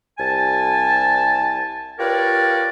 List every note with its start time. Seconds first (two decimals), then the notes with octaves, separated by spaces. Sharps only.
0.19 C2 G#5 A5
1.99 F4 G4 A#4 B4 C#5 D5